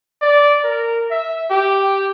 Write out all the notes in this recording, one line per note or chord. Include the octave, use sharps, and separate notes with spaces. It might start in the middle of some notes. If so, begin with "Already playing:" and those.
D5
A#4
E5
G4